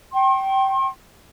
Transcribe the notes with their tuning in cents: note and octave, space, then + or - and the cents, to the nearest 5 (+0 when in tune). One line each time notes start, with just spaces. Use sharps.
G5 -20 C6 +40